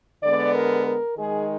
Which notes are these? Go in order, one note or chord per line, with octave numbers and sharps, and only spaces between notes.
D3 G#3 B3 D5
A#4
A#4
D#3 G#3 D#4 G#4